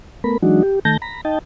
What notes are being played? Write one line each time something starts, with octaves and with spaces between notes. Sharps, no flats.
A3 B3 A#4 B5
E3 F#3 G#3 D4 D#4 F#4
G4
D#3 A3 A5 G6 A#6
A#5 B5
D#4 D#5 G5 A5